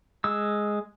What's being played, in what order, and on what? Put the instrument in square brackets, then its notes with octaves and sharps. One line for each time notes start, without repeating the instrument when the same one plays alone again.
[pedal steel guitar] G#3 E6